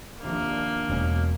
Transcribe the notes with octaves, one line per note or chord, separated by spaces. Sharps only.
D#2 C3 F3 A#3 D4
E1 B2 C#4